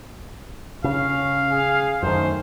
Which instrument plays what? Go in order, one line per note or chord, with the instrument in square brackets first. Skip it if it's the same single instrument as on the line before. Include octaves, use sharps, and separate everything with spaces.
[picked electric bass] C#3 [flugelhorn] C#4 [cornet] F5
[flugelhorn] G#4
[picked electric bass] F#2 D#3 [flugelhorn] A3 [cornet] C5